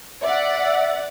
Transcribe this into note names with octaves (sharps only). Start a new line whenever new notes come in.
D5 E5 F#5